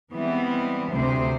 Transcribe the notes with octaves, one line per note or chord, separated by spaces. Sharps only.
E3 G3 G#3 B3 C4
D2 C3 C5